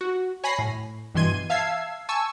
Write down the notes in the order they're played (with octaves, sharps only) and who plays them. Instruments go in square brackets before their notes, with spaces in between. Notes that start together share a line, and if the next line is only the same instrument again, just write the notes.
[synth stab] F#4
C#5 G#5 B5 A#6 C7
A2
G2 B2 E3 C6 G#6 D#7
E5 F5 A5 E6 G#6 C7
G#5 A5 C#6 E6